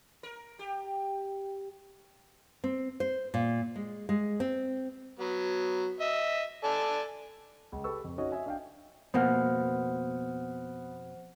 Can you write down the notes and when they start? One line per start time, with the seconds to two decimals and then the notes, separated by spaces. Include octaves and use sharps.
0.23 A#4
0.59 G4
2.64 C4
3.00 C5
3.34 A#2
3.76 G#3
4.09 G#3
4.40 C4
5.19 F#3 B3
6.00 D#5 E5
6.64 A4 D5 G#5
7.72 C#2
7.84 G4 A4 B4 B5 C#6 E6
8.04 F2
8.18 C#4 D#4 F#4 C#5 D#5
8.32 D#5 E5 G#5
8.46 D4 F5 G5
9.14 F2 B2 A#3 B3 C5 F#5 F6